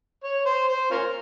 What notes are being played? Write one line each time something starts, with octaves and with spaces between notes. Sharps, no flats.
C#5
C5
C5
C#4 F4 A#4